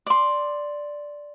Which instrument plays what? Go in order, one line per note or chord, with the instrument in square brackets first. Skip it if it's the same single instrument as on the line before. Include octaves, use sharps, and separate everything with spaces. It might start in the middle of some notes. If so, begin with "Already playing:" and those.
[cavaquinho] D5 C6